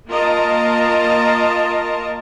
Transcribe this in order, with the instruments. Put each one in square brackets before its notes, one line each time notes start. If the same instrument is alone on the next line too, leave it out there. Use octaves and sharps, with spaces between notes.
[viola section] A#3 F4 A#4 D#5 A5 A#5